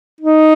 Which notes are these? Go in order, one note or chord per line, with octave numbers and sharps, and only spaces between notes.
D#4